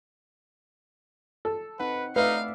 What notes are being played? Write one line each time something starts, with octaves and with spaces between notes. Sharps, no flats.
A4
C4 D#4 B4 F#5
A3 D#4 B4 D5 E5 F5